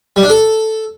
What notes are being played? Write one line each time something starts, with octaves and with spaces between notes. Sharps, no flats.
G3
D4
A4